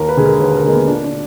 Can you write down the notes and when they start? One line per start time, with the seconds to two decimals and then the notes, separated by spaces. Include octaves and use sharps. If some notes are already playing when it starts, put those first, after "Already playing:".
Already playing: D#2 A#4
0.09 B4
0.17 D3 G#3 G#4
0.26 A#4
0.40 D#2 B4
0.57 A#4
0.64 D3 G#3 A#3
0.73 B3
0.88 A#2 D4
1.04 D4